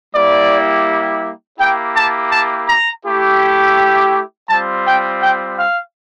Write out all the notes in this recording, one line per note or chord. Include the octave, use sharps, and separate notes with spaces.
G3 A#3 E4 G4 D5
A#3 E4 G4 G5
A5
A5
A#5
A3 E4 G4
G3 C4 F4 A5
G5
G5
F5